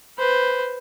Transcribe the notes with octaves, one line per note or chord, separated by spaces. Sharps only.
B4 C5